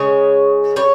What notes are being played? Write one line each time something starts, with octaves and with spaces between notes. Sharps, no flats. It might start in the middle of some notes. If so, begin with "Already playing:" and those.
Already playing: C#3 G#3 C#5
G3 C#5